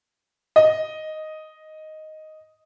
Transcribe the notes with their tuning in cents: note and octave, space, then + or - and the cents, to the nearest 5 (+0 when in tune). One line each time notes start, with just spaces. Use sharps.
D#5 +0